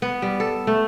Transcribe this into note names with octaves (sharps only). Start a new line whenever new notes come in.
B3
G3
A4
A3